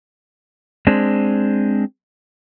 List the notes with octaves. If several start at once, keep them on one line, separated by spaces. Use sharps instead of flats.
G#3 C4 D4